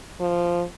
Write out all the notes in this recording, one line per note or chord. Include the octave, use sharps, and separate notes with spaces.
F3